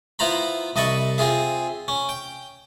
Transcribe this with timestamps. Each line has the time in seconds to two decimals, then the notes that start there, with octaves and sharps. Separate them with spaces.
0.19 B3 E4 F4 C5 A#5 B5
0.76 C2 D#5 E5 A5 B5 C#6
1.18 C4 F4 G#4 E5
1.88 C#4
2.09 G5